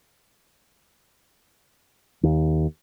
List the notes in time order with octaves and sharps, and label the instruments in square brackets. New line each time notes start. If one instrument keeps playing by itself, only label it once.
[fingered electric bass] D#2